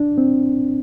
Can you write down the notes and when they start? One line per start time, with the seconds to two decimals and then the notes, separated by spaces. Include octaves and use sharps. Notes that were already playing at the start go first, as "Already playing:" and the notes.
Already playing: D4
0.18 C4